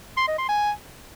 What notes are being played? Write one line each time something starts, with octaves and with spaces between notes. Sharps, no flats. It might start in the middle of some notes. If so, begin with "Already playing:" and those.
C6
D#5
C6
G#5